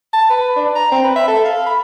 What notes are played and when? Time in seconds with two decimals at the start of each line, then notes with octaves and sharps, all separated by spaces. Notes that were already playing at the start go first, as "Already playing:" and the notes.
0.13 A5
0.30 B4
0.57 D4
0.76 A#5
0.92 C4
1.04 B4
1.16 E5
1.28 A4
1.45 F5
1.67 B5